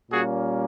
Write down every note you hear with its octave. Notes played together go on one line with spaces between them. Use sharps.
A#2 G3 A#3 C#4 F#4 G#4